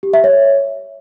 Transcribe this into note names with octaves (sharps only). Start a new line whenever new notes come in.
G4
E5
C#5